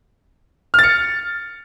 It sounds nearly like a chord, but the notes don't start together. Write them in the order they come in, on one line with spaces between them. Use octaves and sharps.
F6 A6 C#7